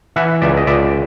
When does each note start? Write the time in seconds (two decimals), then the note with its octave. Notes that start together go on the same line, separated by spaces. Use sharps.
0.16 E3 E5 F#5
0.42 C#2 D5 E5
0.57 D#5
0.67 C#2 D5 E5